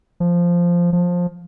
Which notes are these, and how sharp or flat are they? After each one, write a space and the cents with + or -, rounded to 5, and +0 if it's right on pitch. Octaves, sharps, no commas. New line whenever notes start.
F3 -5
F3 +15